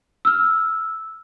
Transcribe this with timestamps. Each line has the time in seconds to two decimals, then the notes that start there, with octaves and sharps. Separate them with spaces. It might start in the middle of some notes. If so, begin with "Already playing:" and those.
0.25 E6 F6